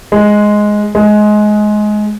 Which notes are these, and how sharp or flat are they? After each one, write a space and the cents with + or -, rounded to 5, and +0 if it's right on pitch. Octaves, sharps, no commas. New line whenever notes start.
G#3 +5
G#3 +20